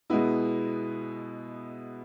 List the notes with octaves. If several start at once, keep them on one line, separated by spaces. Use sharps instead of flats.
B2 G#3 B3 E4